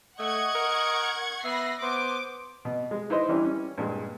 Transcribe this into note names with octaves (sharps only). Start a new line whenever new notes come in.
A3 D#5 F#5 C#6 G#6
A#4
B3 E5 B5 A#6 C7
B3 C5 D6
B2
G#3
D#4 E4 B4 C5 D#5
E3 G3 C#4 D4 E4
C#4
G2 A#2 G#3